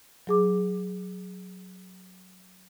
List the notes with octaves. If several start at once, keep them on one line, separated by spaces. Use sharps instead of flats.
F#3 G#4 D6